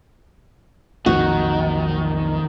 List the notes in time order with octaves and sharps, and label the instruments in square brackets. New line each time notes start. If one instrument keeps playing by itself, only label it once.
[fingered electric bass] B1 F2 A#2 [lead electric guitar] D#3 [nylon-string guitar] F#4